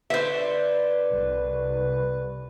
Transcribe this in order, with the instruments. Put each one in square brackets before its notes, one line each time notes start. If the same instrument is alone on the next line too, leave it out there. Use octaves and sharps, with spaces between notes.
[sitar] D3 [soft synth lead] B4 [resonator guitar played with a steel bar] C5 E5
[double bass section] C2